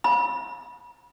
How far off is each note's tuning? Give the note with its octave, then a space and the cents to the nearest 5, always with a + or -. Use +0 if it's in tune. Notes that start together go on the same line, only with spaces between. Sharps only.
B5 -30